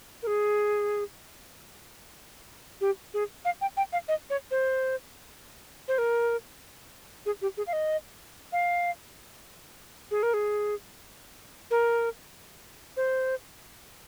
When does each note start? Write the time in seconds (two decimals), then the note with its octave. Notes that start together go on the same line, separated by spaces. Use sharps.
0.23 A#4
0.27 G#4
2.81 G4
3.14 G#4
3.45 F5
3.61 G5
3.77 G5
3.93 F5
4.08 D#5
4.30 C#5
4.51 C5
5.88 C5
5.98 A#4
7.26 G#4
7.42 G4
7.57 G#4
7.67 F5
7.73 D#5
8.53 F5
10.11 G#4
10.23 A#4
10.34 G#4
11.71 A#4
12.97 C5